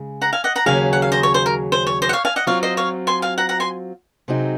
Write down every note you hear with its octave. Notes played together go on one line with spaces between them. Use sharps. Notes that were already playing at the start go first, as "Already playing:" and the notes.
Already playing: C#3 G#3
F#5 A#5
F5 G#5
D#5 F#5
F#5 A#5
D#2 C#3 F#3 C#4 G#4 F5 G#5
F#5
F5
C5 D#5
C#5
C5
A#4
C5
C#5
C5 D#5
F#5
C#5 F5
F5 G#5
D#5 F#5
F#3 C4 F4 C#5 F5
C5 D#5
C#5 F5
G#5 C6
F5 G#5
F#5 A#5
F#5 A#5
G#5 C6
C3 F#3 C4 D#4 G#4